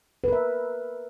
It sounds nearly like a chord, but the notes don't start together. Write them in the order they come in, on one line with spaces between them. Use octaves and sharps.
B4 A#4 E5